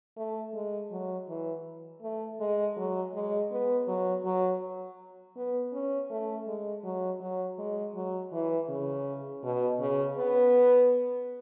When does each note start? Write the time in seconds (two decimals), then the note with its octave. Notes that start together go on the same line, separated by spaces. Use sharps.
0.17 A3
0.54 G#3
0.91 F#3
1.29 E3
2.02 A3
2.40 G#3
2.77 F#3
3.14 G#3
3.51 B3
3.87 F#3
4.25 F#3
5.36 B3
5.73 C#4
6.10 A3
6.47 G#3
6.84 F#3
7.20 F#3
7.58 G#3
7.96 F#3
8.32 E3
8.69 C#3
9.44 B2
9.80 C#3
10.18 B3